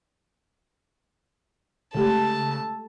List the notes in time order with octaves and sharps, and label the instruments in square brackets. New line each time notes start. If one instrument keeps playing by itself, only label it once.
[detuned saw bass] C#3 [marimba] G#3 A3 G4 [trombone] A4 [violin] A5